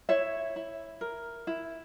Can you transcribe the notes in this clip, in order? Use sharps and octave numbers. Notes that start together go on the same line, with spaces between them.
E4 C#5 E5
E4
A#4
E4